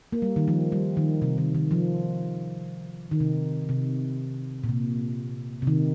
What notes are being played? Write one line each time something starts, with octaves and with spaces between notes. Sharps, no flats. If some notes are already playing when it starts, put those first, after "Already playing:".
A#3
G3
D#3
F3
G3
D#3
C3
D#3
D#3
F3
D#3
C3
C3
A#2
C3
C3
D#3